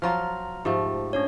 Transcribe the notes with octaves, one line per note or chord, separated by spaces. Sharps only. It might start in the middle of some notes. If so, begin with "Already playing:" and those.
F3 F#3 F4 A#5 F6
G#2 F3 A3 G4
C#4 D4 C#5